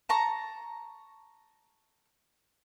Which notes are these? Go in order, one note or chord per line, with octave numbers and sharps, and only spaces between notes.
A5 A#5 C#6